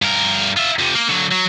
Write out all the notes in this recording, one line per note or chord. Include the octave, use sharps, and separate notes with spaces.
G2 A#4
F4 E5
F2 C3
A#3
D3 F#3
F#3